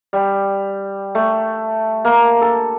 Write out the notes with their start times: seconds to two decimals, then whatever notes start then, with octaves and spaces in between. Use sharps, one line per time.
0.13 G3
1.15 A3
2.05 A#3
2.41 A4